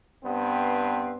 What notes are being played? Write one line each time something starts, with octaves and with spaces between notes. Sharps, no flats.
G2 B3 C4